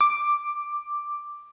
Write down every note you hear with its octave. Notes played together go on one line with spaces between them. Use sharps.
D6